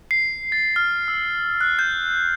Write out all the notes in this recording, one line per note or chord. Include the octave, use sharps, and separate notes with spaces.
C7
A6
F6
E6
F#6
G6